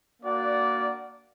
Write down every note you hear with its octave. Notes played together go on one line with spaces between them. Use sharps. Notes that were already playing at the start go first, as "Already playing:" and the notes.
A#3 D4 F#4 D5 F#5